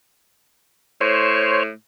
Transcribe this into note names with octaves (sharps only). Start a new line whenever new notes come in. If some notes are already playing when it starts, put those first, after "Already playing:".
A2 C5 C#5